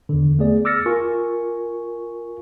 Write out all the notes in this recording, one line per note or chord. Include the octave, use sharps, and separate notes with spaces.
E2 D3
A3 B3 G#4 D5
D6 E6 F6 A6 A#6 C#7
F4 A#4 G#5 C#6